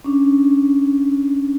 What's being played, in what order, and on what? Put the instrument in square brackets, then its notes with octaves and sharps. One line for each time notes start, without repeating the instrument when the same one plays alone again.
[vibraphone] C#4 D4